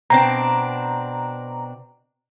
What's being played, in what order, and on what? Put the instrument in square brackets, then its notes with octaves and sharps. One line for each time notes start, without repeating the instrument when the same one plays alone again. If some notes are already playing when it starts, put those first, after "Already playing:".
[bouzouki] B2 C4 D4 [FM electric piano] A#5